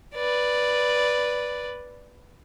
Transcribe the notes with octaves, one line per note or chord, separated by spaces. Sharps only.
B4 D5